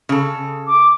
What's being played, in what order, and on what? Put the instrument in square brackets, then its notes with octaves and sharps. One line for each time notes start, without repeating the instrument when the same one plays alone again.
[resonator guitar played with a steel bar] C#3 A4
[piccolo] D6